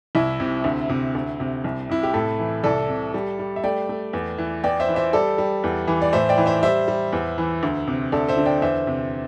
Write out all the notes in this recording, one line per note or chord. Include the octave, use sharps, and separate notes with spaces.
C2 E4
C3
D2
C3
D2
C3
C2
C3 E4
G4
A2 E4 A4
E3
C2 A4 D5
C3
G3
G3
E5
A3 D5 G5
A3
E2
E3
E2 D5 G5
C5 E5
E3
C5 E5
G3 A4 D5
G3
E2
E3
D5
A2 C5 E5
D5 G5
E3
C5 E5
G3 C5 E5
G3
E2
E3
D2
C3
D2 A4 D5
C5 E5
D3
D5 G5
E2 C5 E5
C3